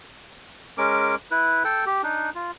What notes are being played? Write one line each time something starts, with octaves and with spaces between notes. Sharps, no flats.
G#3 C#4 A#4 D6
E4 B4
A4 G5
G4
D4 D#4
F4